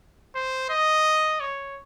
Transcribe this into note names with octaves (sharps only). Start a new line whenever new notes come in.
C5
D#5
C#5